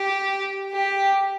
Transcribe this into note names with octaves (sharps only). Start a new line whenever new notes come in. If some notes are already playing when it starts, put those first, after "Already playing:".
Already playing: G4
G4